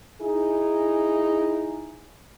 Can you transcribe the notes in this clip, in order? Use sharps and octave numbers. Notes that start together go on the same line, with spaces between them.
D#4 E4 G#4